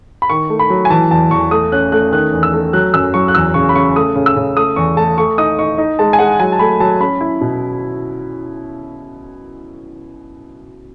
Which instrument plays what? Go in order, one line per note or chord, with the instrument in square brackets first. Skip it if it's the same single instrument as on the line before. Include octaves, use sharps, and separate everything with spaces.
[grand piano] B5
D#3 C#6
A3
B5
F#3
G#5
E3 A5
E2 A5
E2 C#6
A3 D#6
C#4 F#6
A3 F#6
D#3 F#6
E2
E6
A3
F#3 F#6
F#2 E6
F#3 C#6
F#6
E2 E6
C#3 C#6
B5
C#3 C#6
A3 D#6
C#3
E6
C#3
A3 D#6
E2 C#6
A3 A5
A3 C#6
D#4 D#6
D#4 C#6
D#4
G#3 A5
G#5
G#3 F#5
F#3 G#5
A5
A3 B5
F#3 A5
C#4 B5
E4
B2